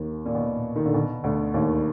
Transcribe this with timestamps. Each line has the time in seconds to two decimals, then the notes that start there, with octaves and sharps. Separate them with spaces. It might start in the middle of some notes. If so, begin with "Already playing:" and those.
Already playing: D#2 D#3
0.26 A#2
0.35 B2
0.76 D#3
0.85 D3
0.94 B2
1.24 D2 D3
1.54 D#2 D#3